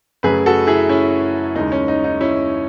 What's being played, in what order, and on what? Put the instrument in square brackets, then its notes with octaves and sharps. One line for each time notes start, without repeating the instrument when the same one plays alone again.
[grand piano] F#2 C#3 F#3 A3 G#4 B4
F#4 A4
E4 G#4
C#4 E4
D#2 C#3 G#3 D#4
C#4
D#4
D#4
C#4 E4